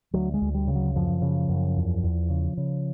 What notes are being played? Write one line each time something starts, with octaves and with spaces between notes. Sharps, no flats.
D2 F#3
G#3
D2
G3
C#3
F#3
F#2 F3
C#3
F#2
E2
E2
C#3
C#3